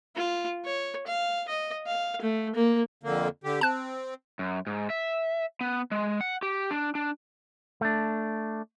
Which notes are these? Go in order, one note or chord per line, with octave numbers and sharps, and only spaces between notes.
F4
C#5
F5
D#5
F5
A3
A#3
F2 D3 A#3
D3 G4
C4 A5 F#6
F#2
G#2
E5
B3
G#3
F#5
G4
D4
D4
A3 D4